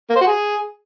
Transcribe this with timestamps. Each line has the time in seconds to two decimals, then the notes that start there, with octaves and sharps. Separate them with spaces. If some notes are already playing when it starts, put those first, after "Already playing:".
0.10 A#3
0.16 C5
0.21 F#4
0.27 G#4